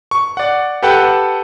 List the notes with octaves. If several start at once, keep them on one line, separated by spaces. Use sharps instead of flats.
C#6
D5 F#5
G4 A4 B4 F#5 G5 A5